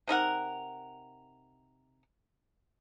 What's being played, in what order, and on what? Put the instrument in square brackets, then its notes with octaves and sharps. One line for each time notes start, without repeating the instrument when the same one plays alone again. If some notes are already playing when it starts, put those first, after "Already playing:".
[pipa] C3 D#4 A#4 F#5